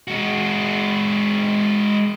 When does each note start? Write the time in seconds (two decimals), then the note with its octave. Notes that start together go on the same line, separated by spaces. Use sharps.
0.08 G#3 F#4